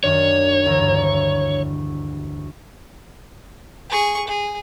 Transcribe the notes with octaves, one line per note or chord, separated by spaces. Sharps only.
F#2 D#3 D4 C#5
E1 D2 A#5
G2
G#4 C#6
G#4